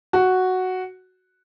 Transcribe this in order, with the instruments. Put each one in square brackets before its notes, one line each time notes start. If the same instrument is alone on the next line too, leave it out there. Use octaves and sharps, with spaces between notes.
[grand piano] F#4